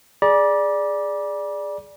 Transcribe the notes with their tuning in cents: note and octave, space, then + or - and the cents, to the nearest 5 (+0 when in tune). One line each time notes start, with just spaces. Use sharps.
G#4 +0 D5 +0 B5 -45